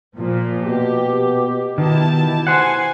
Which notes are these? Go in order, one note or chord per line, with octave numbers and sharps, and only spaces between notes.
A#2 F3
B2 G4
B2 D#3 E4 G4 A5
C5 F#5 G#5